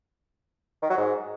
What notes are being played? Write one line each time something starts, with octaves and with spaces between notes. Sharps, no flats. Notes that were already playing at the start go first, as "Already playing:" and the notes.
D#3
F#3
G#2